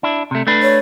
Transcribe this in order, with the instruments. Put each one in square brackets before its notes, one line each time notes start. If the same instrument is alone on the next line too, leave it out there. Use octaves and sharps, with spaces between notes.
[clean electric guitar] D4 E4
C3 A3
A3 D4 B4
[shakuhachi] C#5